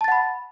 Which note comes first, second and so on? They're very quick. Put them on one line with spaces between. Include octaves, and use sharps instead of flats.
A5 A6 F#5 B5